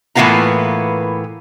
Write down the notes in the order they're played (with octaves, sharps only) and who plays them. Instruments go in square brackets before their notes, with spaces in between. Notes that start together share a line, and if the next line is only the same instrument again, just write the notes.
[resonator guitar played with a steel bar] A2 E3 A#3 B3 F4 A#5